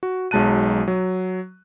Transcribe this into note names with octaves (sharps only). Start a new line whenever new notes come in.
F#4
B1 F#3 G#3 A5 F#6 D#7
F#3